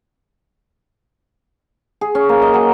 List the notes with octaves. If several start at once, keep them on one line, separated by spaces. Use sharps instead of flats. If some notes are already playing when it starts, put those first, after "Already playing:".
G#4
C#4
A#3
D#5
F#3